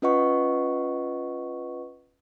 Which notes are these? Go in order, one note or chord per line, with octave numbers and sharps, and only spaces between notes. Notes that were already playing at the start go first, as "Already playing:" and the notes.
C#4 F4 B4 D#5 F#5 C#6